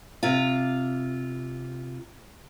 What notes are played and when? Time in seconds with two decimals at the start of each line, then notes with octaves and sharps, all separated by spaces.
0.23 C3 F4